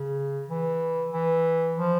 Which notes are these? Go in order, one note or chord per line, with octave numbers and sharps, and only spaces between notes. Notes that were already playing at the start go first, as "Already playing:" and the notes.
Already playing: C#3
E3
E3
F3